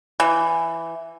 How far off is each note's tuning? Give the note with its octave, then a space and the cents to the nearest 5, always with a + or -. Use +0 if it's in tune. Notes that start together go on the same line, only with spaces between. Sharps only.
E3 +10